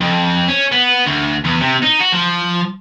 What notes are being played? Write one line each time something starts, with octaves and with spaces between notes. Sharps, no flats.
F2
C#4
B3
D2
E2
C3
D#4
F#4
F3